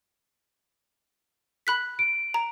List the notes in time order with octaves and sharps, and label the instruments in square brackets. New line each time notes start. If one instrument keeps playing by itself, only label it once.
[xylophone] B5 F#6 B6
[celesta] D7
[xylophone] A#5